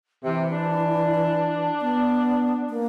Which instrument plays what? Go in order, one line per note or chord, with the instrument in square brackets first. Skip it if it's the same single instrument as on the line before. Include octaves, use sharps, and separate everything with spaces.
[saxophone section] C3 [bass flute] E3
[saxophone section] D4
[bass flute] B3
A#3